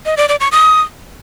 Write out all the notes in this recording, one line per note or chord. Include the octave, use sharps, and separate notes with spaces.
D#5
D5
D5
C#6
D#6